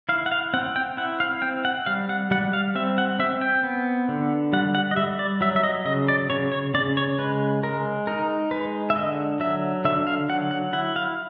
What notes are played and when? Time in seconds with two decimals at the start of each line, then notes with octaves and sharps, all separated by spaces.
0.09 E4 F5
0.26 F#5
0.32 F5
0.54 C4 F#5
0.76 G5
0.97 E4 F#5
1.20 F5
1.42 C4 G5
1.65 F#5
1.86 G3 F5
2.09 F#5
2.31 G3 F#5
2.53 F5
2.75 C4 E5
2.98 F#5
3.19 C4 E5
3.41 G5
3.63 B3
4.09 D3
4.53 G3 F#5
4.75 F#5
4.91 D#5
4.96 G3 E5
5.19 D5
5.41 F#3 E5
5.56 E5
5.63 D#5
5.85 C#3 D#5
6.08 D5
6.30 C#3 C#5
6.52 C#5
6.74 C#3 D5
6.97 C#5
7.19 G#3 B4
7.63 G#3 A#4
8.07 D#4 A#4
8.51 G#3 B4
8.90 E5
8.96 D3 D#5
9.40 F#3 E5
9.85 D3 E5
10.07 F5
10.29 F#3 F#5
10.51 F#5
10.73 E4 F#5
10.96 F5